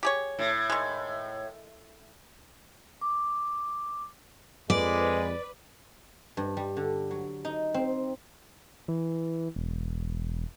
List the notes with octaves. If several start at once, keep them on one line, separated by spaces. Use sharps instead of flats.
G4 G#4 C#5
A2
D#3 G#3
D6
F2 G#3 B4 D5
G2
G3
D3
F#3
D#4
C4
E3
E1